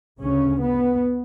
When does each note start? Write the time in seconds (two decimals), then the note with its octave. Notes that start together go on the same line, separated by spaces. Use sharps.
0.21 D2 C#3 C#4
0.62 B3